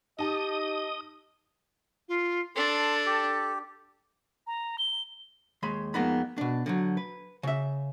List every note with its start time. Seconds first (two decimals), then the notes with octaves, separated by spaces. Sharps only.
0.19 D#4 G4 D#5 A5 D#6
2.09 F4
2.56 D4 A4 C6
3.06 G4
4.47 A#5
4.78 G7
5.63 D#2 G#3 B5 C6
5.94 F2 G#3 A#3 B3 D#4 B5
6.38 B2 D4
6.66 D3 F3 F#3
6.97 B4
7.43 C#3 E5